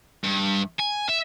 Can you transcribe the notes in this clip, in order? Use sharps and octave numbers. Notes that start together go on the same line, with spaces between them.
G2
G#5
E5